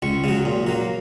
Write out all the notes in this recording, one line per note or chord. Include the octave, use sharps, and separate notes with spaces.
C#2 C#6
C#3 F#3
A#2
F#3 A#3